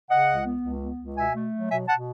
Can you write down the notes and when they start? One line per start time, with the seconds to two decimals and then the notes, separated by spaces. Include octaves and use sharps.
0.10 C#3 D#5 F#5
0.28 C#2
0.46 B3
0.63 C#2
0.81 B3
0.99 C#2
1.17 B2 E5 G#5
1.35 A3
1.54 F#3
1.70 B2 E5 G#5
1.88 B2 F#5 A5